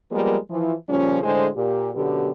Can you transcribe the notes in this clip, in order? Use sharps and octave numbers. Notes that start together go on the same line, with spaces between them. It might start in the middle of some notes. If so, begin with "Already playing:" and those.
F3 G3 G#3 A#3 B3 A#4
E3 F3
A#2 C#3 F3 G3 C#4
A2 D3 G#3 G#4 C5
A#2 G4
F#2 B2 D3 B3 G4